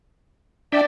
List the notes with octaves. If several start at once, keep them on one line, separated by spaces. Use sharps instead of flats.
D4 D5 E5 G5